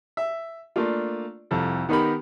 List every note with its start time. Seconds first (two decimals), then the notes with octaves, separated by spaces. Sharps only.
0.17 E5
0.76 A3 A#3 D4 F4
1.51 C2 F2 A4
1.89 D#3 B3 D#4 G4 A#4 B5